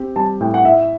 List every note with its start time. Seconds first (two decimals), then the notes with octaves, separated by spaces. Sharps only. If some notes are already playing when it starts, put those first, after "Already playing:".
Already playing: C4 G4
0.16 G3 A5
0.41 A2 G5
0.54 F#5
0.65 E4 E5